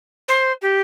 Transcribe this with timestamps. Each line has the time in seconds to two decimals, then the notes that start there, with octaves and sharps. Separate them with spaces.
0.28 C5
0.62 G4